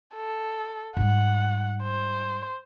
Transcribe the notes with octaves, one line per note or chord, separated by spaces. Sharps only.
A4
G#2 G3 F#5
C5